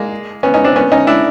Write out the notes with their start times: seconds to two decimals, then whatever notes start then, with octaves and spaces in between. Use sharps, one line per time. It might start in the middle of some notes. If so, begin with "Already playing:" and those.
Already playing: G#3 A#3
0.43 B3 C#4
0.54 C#4 D#4
0.64 C4 D4
0.76 B3 C#4
0.92 C#4 D#4
1.07 D4 E4